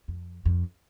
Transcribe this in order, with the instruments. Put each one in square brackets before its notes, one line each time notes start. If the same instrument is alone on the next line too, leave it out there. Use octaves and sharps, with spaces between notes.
[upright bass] F2
F2